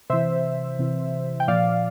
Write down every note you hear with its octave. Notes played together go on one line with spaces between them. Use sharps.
C3 E3 C5 E5
C3 E3
G5
A#2 F3 D5 F5